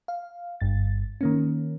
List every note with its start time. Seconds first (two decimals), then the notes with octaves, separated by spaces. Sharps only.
0.08 F5
0.61 G1 G2 A6
1.21 D#3 A#3 C#4